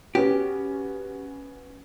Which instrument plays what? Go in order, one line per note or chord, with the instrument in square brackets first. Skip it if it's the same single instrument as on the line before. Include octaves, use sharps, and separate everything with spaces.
[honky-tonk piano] B3 C#4 F#4 [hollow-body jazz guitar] G4